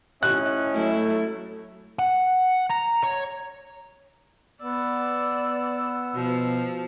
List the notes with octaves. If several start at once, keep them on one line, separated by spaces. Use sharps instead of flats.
A2 C#4 D#5 F#6
F#3 A3 E4
F#5
A#5
C#5
B3 D5 E6
B2 F3